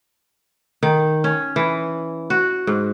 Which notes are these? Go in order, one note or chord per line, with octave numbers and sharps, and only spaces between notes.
D#3
C#4
E3
F#4
G#2